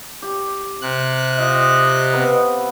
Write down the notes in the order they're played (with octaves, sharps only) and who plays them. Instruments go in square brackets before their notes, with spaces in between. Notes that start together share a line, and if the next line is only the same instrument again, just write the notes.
[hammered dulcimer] G4
[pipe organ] C3 F#6
[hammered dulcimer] F4 [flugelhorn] D#5
[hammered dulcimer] B3 C4 B4